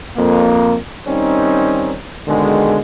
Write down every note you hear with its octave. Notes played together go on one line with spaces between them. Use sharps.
F2 A#3
D#3 G3 C4 C#4 D#4
B2 D3 D#3 G#3